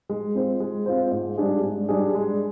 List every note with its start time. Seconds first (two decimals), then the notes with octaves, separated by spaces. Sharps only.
0.09 G#3
0.35 C4 F4 C5
0.60 G#3
0.86 C4 F4 C5
1.11 G#2
1.38 G3 D4 G#4
1.63 G#2
1.89 G3 D4 G#4
2.14 G#3